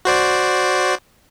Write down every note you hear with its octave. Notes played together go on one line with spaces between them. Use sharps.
F#4 C5 D5